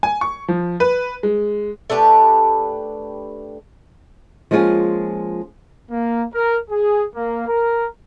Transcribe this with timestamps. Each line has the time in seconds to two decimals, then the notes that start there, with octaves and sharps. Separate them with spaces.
0.03 G#5
0.21 C#6
0.48 F3
0.80 B4
1.23 G#3
1.90 A3 D4 G4 B4
4.51 F3 G#3 A#3 C#4 F4 G#4
5.91 A#3
6.34 A#4
6.71 G#4
7.15 A#3
7.48 A#4